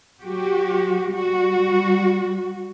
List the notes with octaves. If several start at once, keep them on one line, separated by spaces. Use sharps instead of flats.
F#3 F#4 G4
G3 F#4